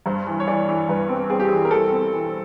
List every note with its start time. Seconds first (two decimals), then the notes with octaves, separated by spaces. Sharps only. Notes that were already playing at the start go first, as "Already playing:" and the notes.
0.06 G2 C5
0.27 E3
0.40 C#5
0.47 E3 D5
0.69 E3
0.89 G2 B4
1.09 C4
1.30 C4 G#4
1.40 G4
1.49 E3 G#4
1.65 A#4
1.71 E3 A4
1.92 C4
2.13 E3